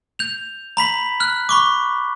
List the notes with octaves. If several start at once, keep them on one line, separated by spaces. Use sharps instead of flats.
G6 F7
A#5 B5 B6 F#7
F6 F#6
B5 C#6 D6